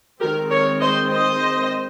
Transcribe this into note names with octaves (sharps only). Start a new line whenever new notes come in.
D#3 G#3 C4 G4 A#4
A#4 C#5
C5 D#5
C5 D#5